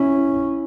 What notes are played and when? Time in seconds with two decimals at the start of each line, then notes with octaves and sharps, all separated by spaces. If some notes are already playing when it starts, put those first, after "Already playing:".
Already playing: C#4 E4